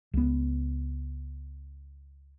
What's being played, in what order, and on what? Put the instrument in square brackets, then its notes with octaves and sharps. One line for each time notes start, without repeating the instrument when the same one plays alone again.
[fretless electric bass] C#2 B3